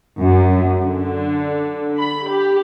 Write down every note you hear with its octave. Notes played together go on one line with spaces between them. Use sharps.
F#2
D3
B5
G4